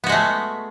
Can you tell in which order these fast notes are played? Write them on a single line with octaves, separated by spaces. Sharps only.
B3 F#4 G#3 A3